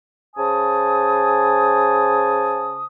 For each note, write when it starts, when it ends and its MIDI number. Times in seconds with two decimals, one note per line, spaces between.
0.36 2.87 49
0.36 2.87 72
0.36 2.87 80
0.36 2.87 81
0.36 2.87 87